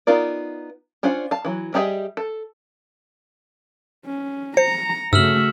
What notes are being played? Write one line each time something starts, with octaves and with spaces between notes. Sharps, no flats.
B3 D#4 F4 A#4 D5
C#4 D4 F4 C5 F#5
F5 A5
E3 F#3
G3 G4 G#4 D#5 E5
A4
C#4
C5 A#5 C#7
G2 C#3 A3 F#4 E5 E6 F6 F#7